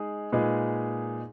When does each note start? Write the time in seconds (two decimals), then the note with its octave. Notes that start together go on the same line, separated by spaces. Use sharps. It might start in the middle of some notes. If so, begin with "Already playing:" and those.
Already playing: G#3 D#4 G#4
0.32 A#2 G#3 D#4 G#4 B4